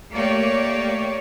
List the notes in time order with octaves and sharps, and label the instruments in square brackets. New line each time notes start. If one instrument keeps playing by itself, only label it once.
[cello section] A3 A#3 G4 C#5 D5